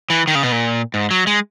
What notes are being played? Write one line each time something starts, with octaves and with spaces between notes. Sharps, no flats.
E3
D#3
C#3
B2
A#2
G#2
F#3
G#3